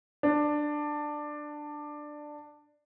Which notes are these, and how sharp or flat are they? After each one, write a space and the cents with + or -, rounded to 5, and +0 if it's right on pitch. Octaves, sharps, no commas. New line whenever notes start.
D4 +15